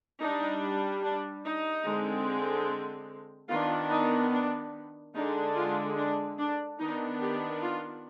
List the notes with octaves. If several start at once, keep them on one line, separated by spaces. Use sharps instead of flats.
G3 D4 D#4
D4
D#4
D3 G#3 C4
D#3 B3 D4 F4
D#4
D4
D3 G#3 D4 D#4
F4
D4
D4
D#3 B3 D4 D#4
G4
F4